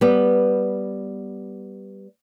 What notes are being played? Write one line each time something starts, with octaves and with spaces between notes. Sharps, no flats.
G3 B3